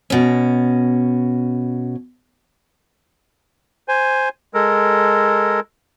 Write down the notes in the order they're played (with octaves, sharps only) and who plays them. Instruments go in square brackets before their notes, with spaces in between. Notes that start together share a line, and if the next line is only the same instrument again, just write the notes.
[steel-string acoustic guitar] B2 C#4
[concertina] C5 G#5
G#3 A4 A#4